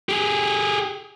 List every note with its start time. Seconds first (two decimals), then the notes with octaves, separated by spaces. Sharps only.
0.09 G4 G#4